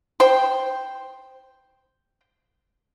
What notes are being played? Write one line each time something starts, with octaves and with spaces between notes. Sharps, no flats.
C5 G5